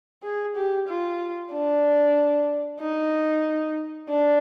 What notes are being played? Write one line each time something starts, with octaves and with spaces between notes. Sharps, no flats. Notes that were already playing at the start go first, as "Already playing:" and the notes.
G#4
G4
F4
D4
D#4
D4